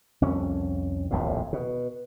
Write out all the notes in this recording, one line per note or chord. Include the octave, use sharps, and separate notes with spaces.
C2 F2 C#4
D#1 A#1 F2 A2
B2